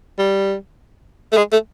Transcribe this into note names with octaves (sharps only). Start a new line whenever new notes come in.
G3
A3
G#3
A3